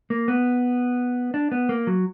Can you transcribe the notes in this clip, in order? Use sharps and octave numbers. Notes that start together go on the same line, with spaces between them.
A#3
B3
D4
B3
A#3
F#3